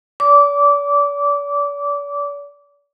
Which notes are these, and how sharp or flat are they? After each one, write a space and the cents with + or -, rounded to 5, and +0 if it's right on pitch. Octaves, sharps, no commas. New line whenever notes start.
D5 -45 D6 -20